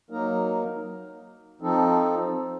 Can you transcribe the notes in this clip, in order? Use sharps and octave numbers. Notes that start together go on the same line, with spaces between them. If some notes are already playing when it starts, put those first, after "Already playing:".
F#3 A#3 D#4 A#4
F3 C4 D#4 A4